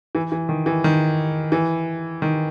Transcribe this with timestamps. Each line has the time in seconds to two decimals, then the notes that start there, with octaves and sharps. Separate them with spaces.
0.15 E3
0.32 E3
0.49 D#3
0.66 E3
0.84 D#3
1.52 E3
2.22 D#3